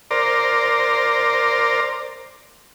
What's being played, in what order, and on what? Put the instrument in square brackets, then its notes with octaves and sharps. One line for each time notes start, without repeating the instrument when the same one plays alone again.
[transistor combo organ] A#4 C5 D5